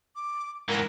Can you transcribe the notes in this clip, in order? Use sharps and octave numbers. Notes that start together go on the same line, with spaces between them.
D6
G#2 E3 A#4